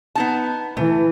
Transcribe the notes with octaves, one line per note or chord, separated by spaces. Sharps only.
B3 D#4 A5
E3 A3